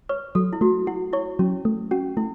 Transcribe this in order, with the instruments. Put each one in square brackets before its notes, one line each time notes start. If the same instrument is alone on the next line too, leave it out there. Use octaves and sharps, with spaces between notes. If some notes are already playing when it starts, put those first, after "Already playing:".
[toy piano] B4 [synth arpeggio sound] C#5
[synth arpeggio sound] F#3 [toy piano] A4
[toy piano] E4
[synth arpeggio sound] A3 [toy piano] F#4
[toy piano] E4 [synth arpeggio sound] F#4
[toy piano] E4 [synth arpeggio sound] C#5
[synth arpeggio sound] F#3 [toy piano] C#4
[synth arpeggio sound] A3
[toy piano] C#4 [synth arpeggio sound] F#4
[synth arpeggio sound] A3 [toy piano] E4